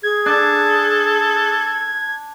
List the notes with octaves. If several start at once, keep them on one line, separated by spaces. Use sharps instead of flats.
G#4 G#6
D4 A4